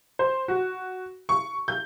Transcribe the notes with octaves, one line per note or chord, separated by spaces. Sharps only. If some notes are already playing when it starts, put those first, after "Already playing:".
C5
F#4
C#6
G6